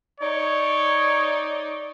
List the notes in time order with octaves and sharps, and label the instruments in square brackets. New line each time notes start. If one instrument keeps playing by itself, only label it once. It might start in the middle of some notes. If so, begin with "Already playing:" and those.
[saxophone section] D#4 D5 [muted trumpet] C#5